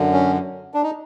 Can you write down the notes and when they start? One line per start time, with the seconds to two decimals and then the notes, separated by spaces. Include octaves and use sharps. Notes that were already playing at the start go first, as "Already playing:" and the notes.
Already playing: F#2 D3
0.13 C#4
0.74 D4
0.83 D#4